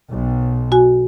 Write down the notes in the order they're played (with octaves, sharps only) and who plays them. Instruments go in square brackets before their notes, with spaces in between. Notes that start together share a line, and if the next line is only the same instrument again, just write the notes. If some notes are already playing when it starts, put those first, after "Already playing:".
[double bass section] B1
[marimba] F#4 G#5